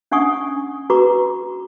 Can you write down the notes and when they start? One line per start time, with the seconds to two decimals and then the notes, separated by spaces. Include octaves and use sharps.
0.11 C#4 D4 F#5 G#5 C#6 D#6
0.90 F#4 G#4 B4 A#5 C#6 D6